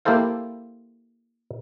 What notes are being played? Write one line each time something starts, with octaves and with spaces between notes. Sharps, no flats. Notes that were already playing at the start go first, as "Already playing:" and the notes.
A#3 E4 G4 A4 C5 F5